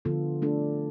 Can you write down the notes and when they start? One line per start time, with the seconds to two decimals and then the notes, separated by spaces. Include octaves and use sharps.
0.05 D3 F3 B3 F4 A4
0.42 A3 D4 A4